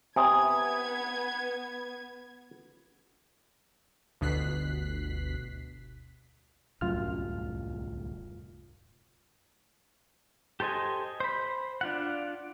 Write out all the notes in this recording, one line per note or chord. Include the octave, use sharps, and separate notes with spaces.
C3 B3 G#5 D#6 G#6
G1 D2 B2 F#6 B6 C7
D1 C2 F#2 A2 F4 F6
G4 A4 C5 D#5 G#5
C5 B5
D4 F4 F#5